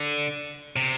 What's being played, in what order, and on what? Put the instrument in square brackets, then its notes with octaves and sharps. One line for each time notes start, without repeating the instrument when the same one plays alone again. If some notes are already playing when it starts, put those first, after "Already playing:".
Already playing: [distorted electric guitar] D3
C3